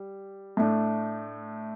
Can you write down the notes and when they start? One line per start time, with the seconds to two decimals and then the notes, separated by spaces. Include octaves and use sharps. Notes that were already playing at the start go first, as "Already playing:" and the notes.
Already playing: G3
0.57 A2 A3 D4